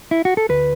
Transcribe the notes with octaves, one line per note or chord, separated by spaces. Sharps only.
E4
F#4
A4
D2 B4